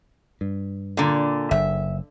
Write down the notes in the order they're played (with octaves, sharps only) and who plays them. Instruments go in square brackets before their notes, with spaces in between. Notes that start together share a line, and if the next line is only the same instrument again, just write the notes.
[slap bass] G2
[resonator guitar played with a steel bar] A#2 D3
[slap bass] F#1 [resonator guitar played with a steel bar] E5